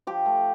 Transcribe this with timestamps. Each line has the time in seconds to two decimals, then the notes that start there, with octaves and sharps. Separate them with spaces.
0.07 F3 G4
0.26 A3